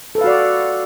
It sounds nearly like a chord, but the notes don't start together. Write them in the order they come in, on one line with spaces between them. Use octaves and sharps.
A4 B4 F5 F#4 D5